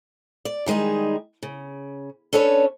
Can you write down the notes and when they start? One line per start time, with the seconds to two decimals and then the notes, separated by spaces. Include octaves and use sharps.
0.45 D5
0.66 D#3 G3 G#3 D#4 G#4
1.43 C#3
2.33 C#4 D4 A4 B4 C#5